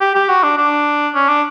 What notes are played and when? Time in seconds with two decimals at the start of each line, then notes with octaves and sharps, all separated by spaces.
0.01 G4
0.15 G4
0.29 F#4
0.43 D4
0.58 D4
1.15 C#4
1.29 D4